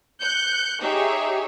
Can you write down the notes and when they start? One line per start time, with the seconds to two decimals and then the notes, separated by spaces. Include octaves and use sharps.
0.21 F#6 G6 C#7
0.81 D#4 G4 G#4 C#5 E5